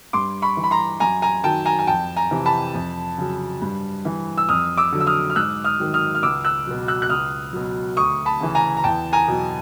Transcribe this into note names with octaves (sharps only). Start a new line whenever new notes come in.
G2 C6 D6
B5 C#6
E3
B5
A#5 C6
F#2 G#5 A#5
G#5 A#5
D#3 F#3 G5 A5
G#5 A#5
G#5
F2 G5 A5
G#5 A#5
C3 E3
A5 B5
F2
C#3 F#3
G2
E3
E6
F2 D#6 F6
D6 E6
D3 F#3
E6
D#6 F6
F6
G#2 E6 F#6
D#6 F6
D#3 F#3
D#6 F6
F6
C#2 D6 E6
E6 F#6
B2 F#3
E6 F#6
F#6
C#2 D#6 F6
B2 F#3
D2 C#6 D#6
A5 B5
C#3 E3
G#5 A#5
A#5
E2 G5 A5
G#5 A#5
B2 F#3